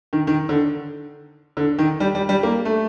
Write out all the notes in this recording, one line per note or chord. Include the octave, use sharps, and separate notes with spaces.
D#3
D#3
D3
D3
D#3
G3
G3
G3
A#3
A3